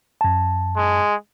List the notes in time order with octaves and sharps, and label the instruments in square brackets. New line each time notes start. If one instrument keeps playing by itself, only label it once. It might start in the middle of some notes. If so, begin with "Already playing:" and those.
[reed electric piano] F#2 A5
[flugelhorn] G#3